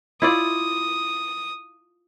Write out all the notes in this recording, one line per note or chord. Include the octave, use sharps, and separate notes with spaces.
E4 F4 D5 D#6